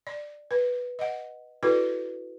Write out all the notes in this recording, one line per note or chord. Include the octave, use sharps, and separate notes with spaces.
D5
B4
D#5 F#5
E4 F#4 A4 B4 D5